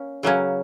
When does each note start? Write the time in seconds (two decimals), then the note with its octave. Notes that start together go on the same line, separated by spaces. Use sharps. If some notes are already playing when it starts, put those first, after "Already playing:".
Already playing: A#3 C#4
0.23 C#3 F#3 A#3 C#4